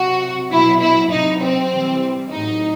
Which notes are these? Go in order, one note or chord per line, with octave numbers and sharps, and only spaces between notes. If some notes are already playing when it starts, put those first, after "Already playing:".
Already playing: C3 F#3 F#4
B2 F#3 E4
E4
C3 F#3 D#4
C4
C3 E3 G3
A2 F#3 D#4